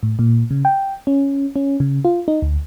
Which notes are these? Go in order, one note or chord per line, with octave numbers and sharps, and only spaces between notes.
A2
A#2
C#3
G5
C#4
C#4
C#3
F4
D#4
D2